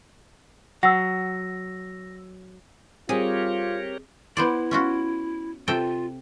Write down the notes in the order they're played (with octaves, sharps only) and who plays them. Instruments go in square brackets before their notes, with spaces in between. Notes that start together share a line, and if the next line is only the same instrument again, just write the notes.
[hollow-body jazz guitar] F#3 [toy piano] F#5 [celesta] E6 A#6
[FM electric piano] G3 C4 [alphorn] F4 [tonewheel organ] G4 A#4 C#5 [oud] G#4
[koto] B3 C5 D5 [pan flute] E4
[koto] C#4 F4 F#4
[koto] C3 A4 G5 [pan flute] F4